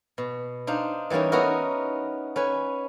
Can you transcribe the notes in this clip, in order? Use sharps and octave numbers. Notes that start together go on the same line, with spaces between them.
B2
D4 D#4 C5 F5
E3 G3 A#3 C#4 D#4
B3 C#4 D#4 E4 F#4 A#4
C#4 B4 G#5